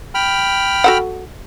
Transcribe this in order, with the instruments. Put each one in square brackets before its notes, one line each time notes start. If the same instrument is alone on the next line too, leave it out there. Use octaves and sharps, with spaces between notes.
[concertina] G5 B5 F6
[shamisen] F#4 A4 F#5